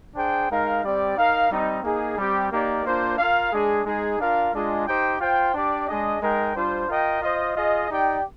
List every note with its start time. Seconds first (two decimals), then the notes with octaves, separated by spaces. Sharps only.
0.15 D4 G#4 C5 G5
0.49 G#3 D#4 A#4 F5
0.83 G3 C4 G4 D5
1.16 D#4 A#4 F5
1.50 G3 C4 D#4
1.83 A#3 D#4 G#4
2.17 G3 C4 G4
2.51 A#3 D#4 G4 A#4 D5
2.84 A#3 D4 F4 C5
3.18 F4 A#4 F5
3.52 G#3 D4 G#4
3.85 G#3 D#4 G#4
4.19 D4 F4 A#4 F5
4.53 G#3 D4 F4 G#4 D#5
4.86 D#4 G4 C5 G5
5.20 F4 C5 G5
5.53 D4 G4 D5
5.87 G#3 D4 G#4 D#5
6.21 G#3 D#4 A#4 D#5 G5
6.55 G3 D4 F4 C5
6.89 F4 A#4 D#5 G5
7.21 F4 C5 D#5
7.56 F4 G#4 D#5
7.89 D#4 G4 D5 G5